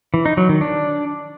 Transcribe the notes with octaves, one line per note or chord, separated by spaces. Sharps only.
E3
D#4
F#3
D#3
D4